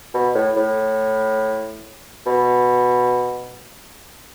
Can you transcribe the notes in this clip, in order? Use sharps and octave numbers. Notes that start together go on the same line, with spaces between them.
B2
A2
A2
B2